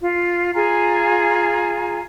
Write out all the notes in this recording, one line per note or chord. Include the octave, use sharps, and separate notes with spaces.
F4
F4 G#4 G#5 A#5